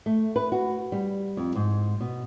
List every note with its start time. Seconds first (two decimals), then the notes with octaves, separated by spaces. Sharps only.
0.06 A3
0.36 B4
0.52 F#4
0.92 G3
1.37 F2
1.55 G#2
2.01 B2